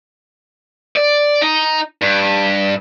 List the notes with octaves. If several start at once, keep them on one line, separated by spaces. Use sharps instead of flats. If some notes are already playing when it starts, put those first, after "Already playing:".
D5
D#4
G2